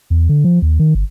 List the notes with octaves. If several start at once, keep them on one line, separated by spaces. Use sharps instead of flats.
E2
D3
F3
D#2
D#3
G1